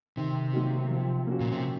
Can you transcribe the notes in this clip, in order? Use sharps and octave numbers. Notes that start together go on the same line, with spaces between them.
C3 D#3
F#3 A#3 D#4 F#4
F3
A#3 C#4 F#4
A#2
C3